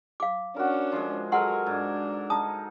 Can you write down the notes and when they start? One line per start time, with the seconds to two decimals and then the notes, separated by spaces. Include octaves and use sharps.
0.20 F5 D6
0.56 C#4 D4 F#4 A#4
0.92 F3 G#3
1.32 F#3 G#3 A4 A#4 F#5 G#5 C6
1.66 G#2 D4
2.30 D#4 A5 D#6